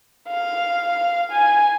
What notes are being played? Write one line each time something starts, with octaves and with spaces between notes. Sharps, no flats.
F5
G#5